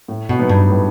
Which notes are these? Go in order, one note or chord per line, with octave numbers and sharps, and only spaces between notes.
A2
B2
F#3 B3 D#4
G2
A2